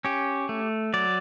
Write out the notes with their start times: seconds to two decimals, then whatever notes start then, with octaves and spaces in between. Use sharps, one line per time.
0.05 C#4 G4
0.49 A3
0.94 F#3 D5